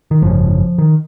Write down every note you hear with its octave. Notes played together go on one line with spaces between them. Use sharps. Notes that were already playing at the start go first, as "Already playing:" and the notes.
D#3
G#1 F#2 C#3 F3
D#3